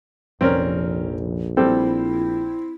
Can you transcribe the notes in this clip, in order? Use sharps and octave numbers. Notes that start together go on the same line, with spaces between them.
F1 A#1 C4 C#4 A#4
G3 C4 E4 A4